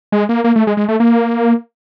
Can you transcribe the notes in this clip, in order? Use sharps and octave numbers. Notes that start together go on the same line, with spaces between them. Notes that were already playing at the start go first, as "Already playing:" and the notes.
G#3
A#3
A#3
A3
G#3
G#3
A3
A#3